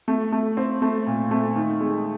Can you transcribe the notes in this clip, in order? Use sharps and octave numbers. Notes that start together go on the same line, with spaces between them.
A3
A3
C4
A3
A#2
A3
D#3
G#3